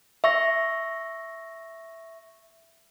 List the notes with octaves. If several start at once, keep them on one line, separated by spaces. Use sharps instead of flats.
E5 C#6 A#6